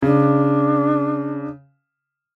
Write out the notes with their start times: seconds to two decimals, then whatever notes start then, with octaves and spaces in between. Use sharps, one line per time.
0.02 C#3 D4